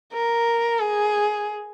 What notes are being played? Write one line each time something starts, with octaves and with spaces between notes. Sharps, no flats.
A#4
G#4